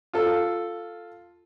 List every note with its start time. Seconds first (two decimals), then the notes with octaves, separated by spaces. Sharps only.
0.13 F4 A4